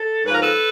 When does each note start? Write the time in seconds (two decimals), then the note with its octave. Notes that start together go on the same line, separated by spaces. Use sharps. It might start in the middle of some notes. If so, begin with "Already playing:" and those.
Already playing: A4
0.24 G#2 B4
0.28 F3
0.34 A#4
0.42 A4 B4